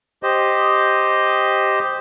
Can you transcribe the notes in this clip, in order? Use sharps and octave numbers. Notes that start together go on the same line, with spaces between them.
G4 C5 D#5